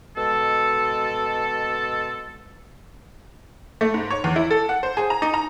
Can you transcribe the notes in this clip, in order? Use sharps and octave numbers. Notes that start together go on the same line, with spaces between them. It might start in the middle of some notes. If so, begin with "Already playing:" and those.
B2 G#3 A4
A3
G#2
C#5
E2
E4
A4
F#5
C5
G#4
A#5
D#4
A#5